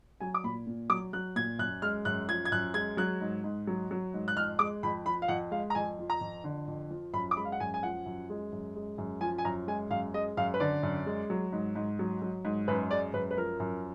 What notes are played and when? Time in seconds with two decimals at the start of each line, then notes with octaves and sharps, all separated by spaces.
0.20 F#3 G#5
0.34 D6
0.44 A#2 B5
0.67 A#2
0.90 F#3 D6
1.13 F#3 F#6
1.36 A#2 G#6
1.59 F#2 F#6
1.82 G#3 F6
2.05 F#2 F#6
2.29 F3 G#6
2.45 G#6
2.52 F#2 F#6
2.74 G#3 G#6
2.97 F#3 F#6
3.21 G#2
3.44 G#2
3.67 F#3
3.91 F#3
4.14 G#2
4.28 F#6
4.36 F2 F6
4.59 G#3 D6
4.83 F2 B5
5.05 F3 B5
5.22 F5
5.28 F2 F#5
5.51 G#3 F5
5.70 A#5
5.75 F2 G#5
5.99 F3
6.10 A#5
6.21 F2
6.44 D3
6.68 F2
6.90 F3
7.14 F#2 B5
7.31 D6
7.36 G#3 B5
7.45 F5
7.52 F#5
7.60 F#2 G#5
7.74 G#5
7.83 F3 F#5
8.06 F#2
8.30 G#3
8.52 F#2
8.76 G#3
8.98 F#2
9.21 F3 G#5
9.38 G#5
9.45 F#2 A#5
9.67 G#3 G#5
9.90 F#2 F5
10.14 G#3 D#5
10.37 F#2 F5
10.54 B4
10.60 D3 D5
10.83 F#2
11.06 G#3
11.30 F#3
11.53 G#2
11.76 G#2
11.99 F#3
12.22 F#3
12.45 G#2
12.68 F#2 B4
12.91 G#3 D5
13.14 F#2 B4
13.31 B4
13.37 F3 A#4
13.60 F#2